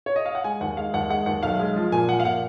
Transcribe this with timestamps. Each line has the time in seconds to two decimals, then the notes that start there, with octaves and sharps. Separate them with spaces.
0.06 C#5
0.16 D#5
0.26 F5
0.35 F#5
0.44 G#3 G#5
0.61 D#2 F#5
0.77 G#3 F5
0.94 D#2 F#5
1.09 G#3 F#5
1.26 D#2 F#5
1.43 B1 F5
1.60 G#3
1.76 F3
1.92 A#2 G#5
2.09 F3 F#5
2.20 F5
2.25 A#2 F#5